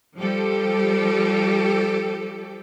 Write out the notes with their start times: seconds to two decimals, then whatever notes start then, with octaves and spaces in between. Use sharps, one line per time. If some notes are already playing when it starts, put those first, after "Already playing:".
0.17 F3 G3 G4 A4